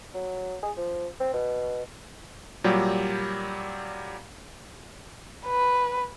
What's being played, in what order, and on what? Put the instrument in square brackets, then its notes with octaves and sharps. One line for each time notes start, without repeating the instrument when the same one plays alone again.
[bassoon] F#3
G#4
F3
C4
B2
[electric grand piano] A#2 F#3 G3 G4
[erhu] B4